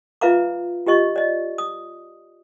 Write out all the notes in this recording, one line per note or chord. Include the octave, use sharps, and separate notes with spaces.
F4 B4 E5 F5 A#5 D6
F4 G4 D#5 C#6
D5 D#5
D#6